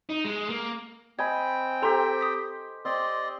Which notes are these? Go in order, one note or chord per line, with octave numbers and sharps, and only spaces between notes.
D#4
G#3
A#3
C4 D#5 G5 G#5 B5 G#6
G4 A4 C5 A#5 C6
D#6 B6
C4 D5 D#5 C6